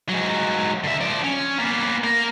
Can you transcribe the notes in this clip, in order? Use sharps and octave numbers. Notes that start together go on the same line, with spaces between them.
G#2 F#3
D3 E5
F3 D5
C#4
A#3 B3
A#3 A#4